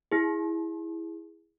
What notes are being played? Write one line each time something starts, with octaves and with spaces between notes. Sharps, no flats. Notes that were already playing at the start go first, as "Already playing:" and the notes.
E4 G#4